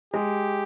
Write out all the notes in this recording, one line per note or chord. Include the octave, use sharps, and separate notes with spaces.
G#3 G4